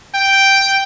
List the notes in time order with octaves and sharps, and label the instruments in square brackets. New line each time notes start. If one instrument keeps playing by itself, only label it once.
[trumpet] G5